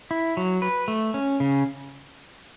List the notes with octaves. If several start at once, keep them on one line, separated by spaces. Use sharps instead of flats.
E4
F#3
B4
A3
C#4
C#3